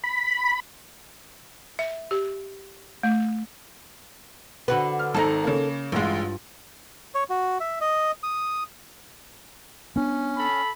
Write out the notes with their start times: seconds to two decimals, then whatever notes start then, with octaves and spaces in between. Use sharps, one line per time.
0.04 B5
1.79 E5
2.11 G4
3.03 A3
4.68 D3 F#4 B4
4.99 F6
5.15 G#1 D#4 A4 A#5
5.44 C#3 A#3
5.92 A1 G2 G#3 F4
7.15 C#5
7.30 F#4
7.60 E5
7.81 D#5
8.23 D#6
9.96 B3 C#4 D4
10.37 A4 B5